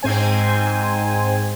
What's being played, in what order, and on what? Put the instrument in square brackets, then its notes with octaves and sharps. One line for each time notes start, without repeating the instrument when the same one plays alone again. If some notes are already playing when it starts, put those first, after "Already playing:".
[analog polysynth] G#2 C4 C5 G#5